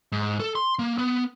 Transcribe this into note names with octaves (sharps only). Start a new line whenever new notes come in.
G#2
A4
C6
A#3
B3